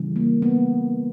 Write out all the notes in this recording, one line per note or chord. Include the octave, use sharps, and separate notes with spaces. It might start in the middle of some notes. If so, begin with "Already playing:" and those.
Already playing: C#3 E3 G3
A#3
B3